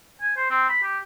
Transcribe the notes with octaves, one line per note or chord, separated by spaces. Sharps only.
G#5
C5
C4
B5
G4